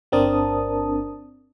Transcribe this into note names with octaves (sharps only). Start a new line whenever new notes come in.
G1 C4 D4 A#4 A5 D#6